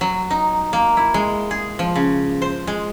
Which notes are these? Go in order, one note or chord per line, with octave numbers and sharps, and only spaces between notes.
F#3
D#4
A#3
E4
G#3
G#4
F3
C#3
C5
G#3